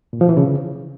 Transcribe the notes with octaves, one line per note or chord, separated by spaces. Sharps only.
A#2
F3
E3
C#3